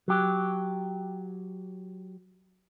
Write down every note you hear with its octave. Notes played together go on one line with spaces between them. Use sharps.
F#3 G4